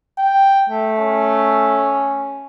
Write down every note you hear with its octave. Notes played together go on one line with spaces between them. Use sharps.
G5
A3
C#4